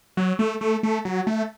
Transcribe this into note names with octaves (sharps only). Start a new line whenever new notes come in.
F#3
A3
A3
A3
F#3
A3